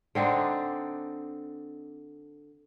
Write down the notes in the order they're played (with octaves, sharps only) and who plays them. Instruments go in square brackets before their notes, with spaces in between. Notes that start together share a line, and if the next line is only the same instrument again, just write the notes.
[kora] D3 C4 D4 D#4